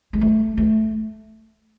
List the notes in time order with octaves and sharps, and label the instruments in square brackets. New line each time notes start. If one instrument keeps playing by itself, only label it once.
[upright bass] G#3
A3
A3